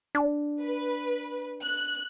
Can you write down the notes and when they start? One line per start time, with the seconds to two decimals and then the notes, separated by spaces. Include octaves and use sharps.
0.15 D4
0.62 B4
1.64 F#6